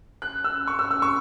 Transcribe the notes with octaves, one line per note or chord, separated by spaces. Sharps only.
F#6
E6
C#6
E6
E6
C#6